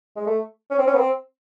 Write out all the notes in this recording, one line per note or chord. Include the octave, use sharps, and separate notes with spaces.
G#3
A3
C#4
C4
C#4
B3
C4